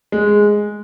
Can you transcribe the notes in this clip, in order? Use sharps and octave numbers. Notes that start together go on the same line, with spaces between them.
G#3